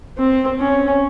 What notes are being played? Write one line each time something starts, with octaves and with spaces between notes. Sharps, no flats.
C4
C#4